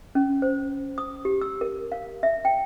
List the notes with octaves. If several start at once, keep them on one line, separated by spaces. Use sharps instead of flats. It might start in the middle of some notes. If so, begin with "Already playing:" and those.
C#4
C5
D#6
G4
E6
A#4
F5
E5
G5